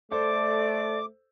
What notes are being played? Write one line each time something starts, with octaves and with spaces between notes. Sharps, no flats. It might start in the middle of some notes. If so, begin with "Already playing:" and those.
A3 A4 C5 D5 D6